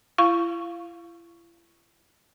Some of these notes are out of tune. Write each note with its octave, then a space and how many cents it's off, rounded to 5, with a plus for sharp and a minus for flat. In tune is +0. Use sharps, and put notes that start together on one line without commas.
E4 +40 F5 +0 C#6 +0